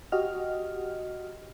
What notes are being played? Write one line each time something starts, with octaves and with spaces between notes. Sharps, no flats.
F#4 G4 D#5 F6